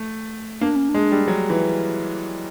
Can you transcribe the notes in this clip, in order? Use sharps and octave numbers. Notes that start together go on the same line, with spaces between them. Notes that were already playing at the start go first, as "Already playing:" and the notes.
Already playing: A3
A#3 D4
C#4
D4
G#3
G3
F#3
E3